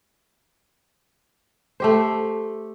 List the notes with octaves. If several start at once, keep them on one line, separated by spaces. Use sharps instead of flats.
A3 G4 C5